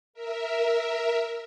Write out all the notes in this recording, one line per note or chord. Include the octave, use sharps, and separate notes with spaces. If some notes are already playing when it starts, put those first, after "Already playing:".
A#4 E5